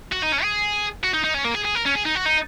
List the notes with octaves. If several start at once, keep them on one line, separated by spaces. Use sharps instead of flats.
F#4
D#4
C#4
G#4
F#4
D#4
D#4
C#4
A#3
G#4
G#4
A#4
C#4
G#4
D#4
F#4
D#4